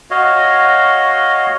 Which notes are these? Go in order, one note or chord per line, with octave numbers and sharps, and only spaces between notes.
F#4 C#5 D#5 F5